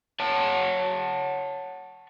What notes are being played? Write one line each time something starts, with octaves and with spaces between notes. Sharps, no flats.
C#5 F#5 A5